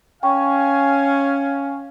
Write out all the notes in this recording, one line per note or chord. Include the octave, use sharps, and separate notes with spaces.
C#4 F5 G5 G#5 C#6